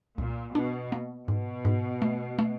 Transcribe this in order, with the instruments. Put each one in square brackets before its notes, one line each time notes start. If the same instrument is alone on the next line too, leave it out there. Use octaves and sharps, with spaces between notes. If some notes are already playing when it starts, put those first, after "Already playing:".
[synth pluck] C2 [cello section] A#2
[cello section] B2 [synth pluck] D4
[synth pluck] A#3
[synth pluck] G#2 [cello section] B2
[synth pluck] G#2
A3
A3